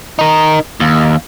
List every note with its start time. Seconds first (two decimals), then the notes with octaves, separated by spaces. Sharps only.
0.19 D#4 A#4
0.80 D#2